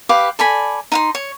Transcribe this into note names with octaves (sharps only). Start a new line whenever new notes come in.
G4 B4 F5 D6
A4 D5 G#5 B5
D#4 F#5 C6
C#5